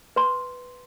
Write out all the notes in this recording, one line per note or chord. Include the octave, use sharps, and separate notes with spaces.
B4 C6